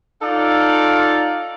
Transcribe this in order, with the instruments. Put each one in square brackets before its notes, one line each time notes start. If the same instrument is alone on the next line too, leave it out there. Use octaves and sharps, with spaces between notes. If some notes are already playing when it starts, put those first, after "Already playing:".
[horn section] D#4 F4 A4 D5 F5